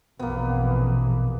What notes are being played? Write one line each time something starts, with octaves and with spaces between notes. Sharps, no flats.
A#1 F2 B2 E3 A#3 B3